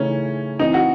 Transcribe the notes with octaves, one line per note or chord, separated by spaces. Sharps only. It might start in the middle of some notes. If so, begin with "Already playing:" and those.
Already playing: C#3 E3 A3 C#4 D#4
E3 C4 D#4 E4
F#4